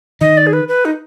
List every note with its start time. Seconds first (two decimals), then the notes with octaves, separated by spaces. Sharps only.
0.21 D#3 D#5
0.37 D5
0.47 G#4
0.53 B4
0.68 B4
0.85 D#4